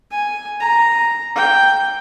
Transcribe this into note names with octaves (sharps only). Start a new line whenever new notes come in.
G#5
A#5
G5